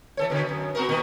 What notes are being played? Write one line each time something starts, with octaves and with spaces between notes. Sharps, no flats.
E3 A4 C#5
B2 D3
F#2
B3 F#4 A#4
A#2 D#3 B3